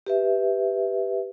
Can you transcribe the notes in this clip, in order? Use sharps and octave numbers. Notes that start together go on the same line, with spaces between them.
G4 B4 E5